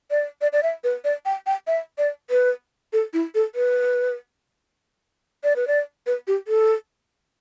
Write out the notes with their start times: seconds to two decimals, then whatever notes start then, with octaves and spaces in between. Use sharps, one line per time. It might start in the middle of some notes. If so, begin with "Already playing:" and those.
0.11 D5
0.41 D5
0.53 D5
0.63 E5
0.84 B4
1.04 D5
1.25 G5
1.46 G5
1.67 E5
1.98 D5
2.30 B4
2.93 A4
3.13 E4
3.35 A4
3.55 B4
5.44 D5
5.56 B4
5.67 D5
6.07 B4
6.27 G4
6.48 A4